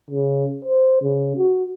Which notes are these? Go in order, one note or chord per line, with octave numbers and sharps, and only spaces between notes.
C#3
C5
C#3
F#4